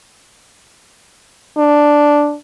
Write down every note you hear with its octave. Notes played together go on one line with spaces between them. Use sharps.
D4